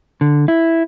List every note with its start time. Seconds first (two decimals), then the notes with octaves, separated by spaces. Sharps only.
0.21 D3
0.48 E4